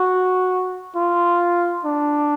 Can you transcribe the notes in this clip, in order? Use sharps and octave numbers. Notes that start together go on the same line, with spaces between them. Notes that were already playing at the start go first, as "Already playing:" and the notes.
Already playing: F#4
F4
D4